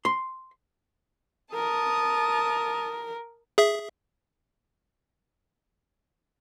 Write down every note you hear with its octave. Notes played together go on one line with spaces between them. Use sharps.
C6
A#4 A5 D#6
G#4 E5